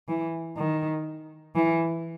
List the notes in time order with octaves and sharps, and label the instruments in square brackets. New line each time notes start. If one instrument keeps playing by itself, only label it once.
[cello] E3
D#3
E3